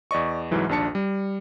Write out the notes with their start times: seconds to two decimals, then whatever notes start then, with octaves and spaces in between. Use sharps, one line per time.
0.11 E2 D5 D#5 C#6
0.51 C2 G#2 E3 F#3
0.69 A#1 D#2 D4 A5 C#7
0.95 G3